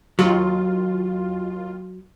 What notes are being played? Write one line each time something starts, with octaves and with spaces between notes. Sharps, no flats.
D#2 F#3 F4